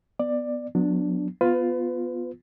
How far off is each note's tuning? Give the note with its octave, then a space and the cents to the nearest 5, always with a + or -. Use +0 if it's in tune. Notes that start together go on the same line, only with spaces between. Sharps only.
B3 +0 D5 +15
F#3 -30 B3 +0 D4 -5
B3 -5 F4 +10 B4 +30